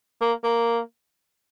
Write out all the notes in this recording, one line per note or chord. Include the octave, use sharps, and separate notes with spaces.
A#3
A#3